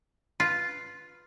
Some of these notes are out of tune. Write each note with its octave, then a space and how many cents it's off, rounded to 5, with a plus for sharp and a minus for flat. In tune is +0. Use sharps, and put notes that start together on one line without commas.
F4 +0 B4 +0